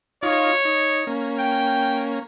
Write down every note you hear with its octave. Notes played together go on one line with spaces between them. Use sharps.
D#4 F4 C#5
D#4
A#3 C#4
G5